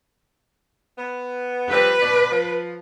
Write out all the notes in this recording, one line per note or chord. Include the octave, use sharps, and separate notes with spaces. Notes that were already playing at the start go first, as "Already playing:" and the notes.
B3
F3 G3 C4 B4
B2 F#3 D5
F3